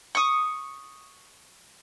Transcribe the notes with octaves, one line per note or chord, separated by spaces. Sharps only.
C#6 D#6